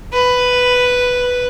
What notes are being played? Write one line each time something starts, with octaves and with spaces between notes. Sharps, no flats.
B4